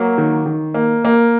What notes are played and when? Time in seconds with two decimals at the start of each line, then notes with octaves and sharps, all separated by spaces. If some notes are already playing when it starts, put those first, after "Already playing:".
Already playing: F#3 A#3
0.18 D#3
0.46 D#3
0.74 A#3
1.05 A#3